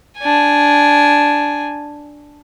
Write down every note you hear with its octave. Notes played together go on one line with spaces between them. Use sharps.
D4 G#5